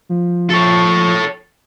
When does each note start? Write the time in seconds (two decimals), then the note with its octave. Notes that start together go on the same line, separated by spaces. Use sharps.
0.09 F3
0.50 A4 C#5